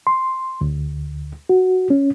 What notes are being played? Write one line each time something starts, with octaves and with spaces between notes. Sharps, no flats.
C6
D2
F#4
C#4